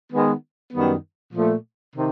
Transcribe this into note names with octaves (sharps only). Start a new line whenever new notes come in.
D#3 G#3 B3
F#2 D#3 G3 B3
A#2 F3 A3
C3 D#3